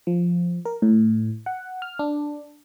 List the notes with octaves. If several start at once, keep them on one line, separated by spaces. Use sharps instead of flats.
F3
A#4
A2
F#5
F6
D4